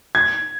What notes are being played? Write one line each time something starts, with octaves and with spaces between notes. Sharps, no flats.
G#6